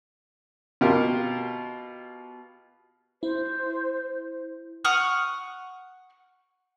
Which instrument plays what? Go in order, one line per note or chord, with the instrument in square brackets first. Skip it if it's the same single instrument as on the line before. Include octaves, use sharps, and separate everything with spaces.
[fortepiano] B2 F4 G4 A#4
[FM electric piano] E4 [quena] C5
[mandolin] F#5 C#6 D#6 F6